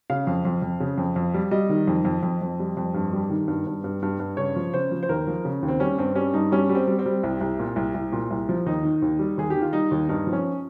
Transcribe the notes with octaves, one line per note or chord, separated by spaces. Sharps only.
C#3 F5
F2
F2
F2
C#3
F2
F2
G3
G3 D#5
D#3
F2
F2
F2
F2
G3
F2
G2
G3
D#3
G2
G2
G2
G2
G2
C#3 C#5
F3
C#3 C5
F3
C5
D#2 A#4
F3
C#3
D#2
C4
G3 C#4
G2 C4
G3 C#4
G2 D#4
G3 C#4
G3
C4
G3
C4
G3
C2
C2
A#2
C2
C2
A#2
C2
F3
D#2 D#4
D#3
D#2
G3
D#2 G#4
G4
D#3
F4
G3 D#4
D#2
G2 D#4
F3
C#4